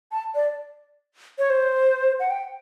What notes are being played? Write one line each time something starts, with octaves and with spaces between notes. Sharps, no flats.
A5
D5
C#5
C5
F#5
G5